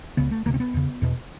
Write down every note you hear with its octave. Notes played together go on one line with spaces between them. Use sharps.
C#2 C#3 B3
A3
D2 C3 A#3
C4
B3
E2 C#3
E2 B2